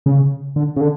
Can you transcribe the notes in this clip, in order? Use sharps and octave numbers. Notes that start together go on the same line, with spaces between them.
C#3
D3
C#3
D3